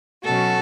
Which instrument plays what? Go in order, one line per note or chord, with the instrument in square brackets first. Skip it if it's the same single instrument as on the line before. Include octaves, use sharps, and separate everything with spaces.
[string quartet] B2 F#3 C#4 F#4 A4